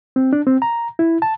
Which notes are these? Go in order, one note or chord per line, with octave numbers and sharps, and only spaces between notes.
C4
D4
C4
A#5
E4
A5